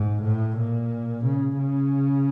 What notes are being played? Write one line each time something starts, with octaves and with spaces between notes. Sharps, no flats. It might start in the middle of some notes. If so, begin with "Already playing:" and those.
Already playing: G#2
A2
A#2
C#3
C#3